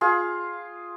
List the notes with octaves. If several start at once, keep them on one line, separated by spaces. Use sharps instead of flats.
F4 G#4 F5